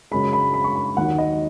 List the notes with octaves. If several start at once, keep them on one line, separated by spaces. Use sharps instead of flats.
F#2 C#3 G#3 B5
B5
B5
C#6
B5
D#2 D#3 F#3 F#5
D#5